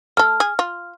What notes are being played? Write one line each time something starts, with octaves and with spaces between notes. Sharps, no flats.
A3 A4 F6
G#4
F4